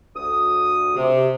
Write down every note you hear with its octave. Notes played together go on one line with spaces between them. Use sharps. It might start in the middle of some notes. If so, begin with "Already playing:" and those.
D2 D#6
C3